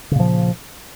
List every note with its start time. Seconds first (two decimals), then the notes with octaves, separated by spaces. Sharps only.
0.11 C#3
0.16 A#2
0.20 F3